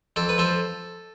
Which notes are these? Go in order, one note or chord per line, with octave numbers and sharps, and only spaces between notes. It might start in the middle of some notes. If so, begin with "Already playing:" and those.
F2 A4
B4
F3 A4